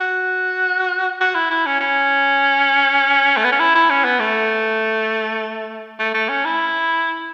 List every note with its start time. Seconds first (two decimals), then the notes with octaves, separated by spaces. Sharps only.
0.01 F#4
1.21 F#4
1.35 E4
1.50 E4
1.66 C#4
1.80 C#4
3.37 A3
3.44 B3
3.52 C#4
3.59 E4
3.75 E4
3.90 C#4
4.05 B3
4.19 A3
5.99 A3
6.14 A3
6.29 C#4
6.45 E4